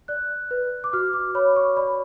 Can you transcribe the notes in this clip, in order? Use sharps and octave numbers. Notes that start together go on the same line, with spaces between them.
D5 F#6
B4
D6
F#4 F6
D6
C#5 B5
C#6
D5 B5